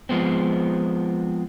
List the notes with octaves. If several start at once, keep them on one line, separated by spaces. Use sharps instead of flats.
F3 G#3 B3 C4